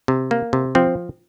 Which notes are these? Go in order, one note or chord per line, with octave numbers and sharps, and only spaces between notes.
C3
A#3
C3
F3 C4